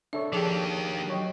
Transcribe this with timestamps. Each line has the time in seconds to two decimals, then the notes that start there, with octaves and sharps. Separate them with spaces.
0.13 D4 A4 C#5 E5
0.32 D#3 F3 G4 G#4 A5
1.08 F#3 C#5 D#5